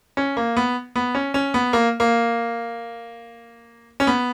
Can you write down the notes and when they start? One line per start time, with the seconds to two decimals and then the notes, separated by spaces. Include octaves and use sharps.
0.17 C#4
0.37 A#3
0.57 B3
0.96 B3
1.15 C#4
1.34 C#4
1.54 B3
1.73 A#3
2.00 A#3
4.00 C#4
4.07 B3